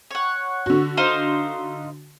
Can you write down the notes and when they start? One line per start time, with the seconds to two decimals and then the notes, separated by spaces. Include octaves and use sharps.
0.11 C#5 F#5
0.66 D3 F#4
0.97 D#4 C5 F5